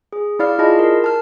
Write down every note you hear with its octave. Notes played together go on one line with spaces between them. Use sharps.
G#4
E4 D5 F5 F6
E4 F4 G#4 D#5 A5
A#4
A5 F6